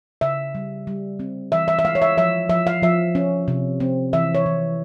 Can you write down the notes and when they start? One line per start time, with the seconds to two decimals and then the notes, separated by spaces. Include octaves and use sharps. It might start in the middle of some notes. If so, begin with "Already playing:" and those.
0.21 C#3 E5
0.55 G3
0.87 G3
1.19 C4
1.52 E3 E5
1.68 E5
1.79 E5
1.85 G#3 F5
1.95 C#5
2.02 E5
2.17 F3 E5
2.49 F3 E5
2.67 F5
2.82 F3 E5
3.15 C#4
3.48 C3
3.80 C4
4.13 E3 E5
4.35 C#5
4.46 E3